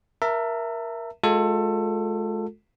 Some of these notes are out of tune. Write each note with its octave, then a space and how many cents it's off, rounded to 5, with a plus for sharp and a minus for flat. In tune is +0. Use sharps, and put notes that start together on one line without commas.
A#4 +15 E5 +10 A5 +40
G#3 +35 F4 +35 A4 +20